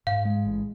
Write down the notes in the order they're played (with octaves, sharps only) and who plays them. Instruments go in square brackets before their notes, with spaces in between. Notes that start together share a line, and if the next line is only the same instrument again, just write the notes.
[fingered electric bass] G#2 [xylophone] F5
[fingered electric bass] G#3
A1